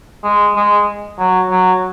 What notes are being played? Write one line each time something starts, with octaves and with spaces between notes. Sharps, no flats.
G#3
G#3
F#3
F#3